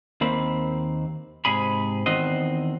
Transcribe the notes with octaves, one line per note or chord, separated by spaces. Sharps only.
D#2 A#3 C4 B5
G#2 C3 G#4 B5
E2 D#3 C4 F#4 C5 D#5